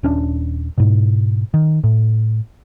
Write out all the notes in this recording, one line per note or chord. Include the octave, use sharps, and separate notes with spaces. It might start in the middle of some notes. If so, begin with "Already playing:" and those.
D#1 C#4 D4
G#2 B2
D#3
A2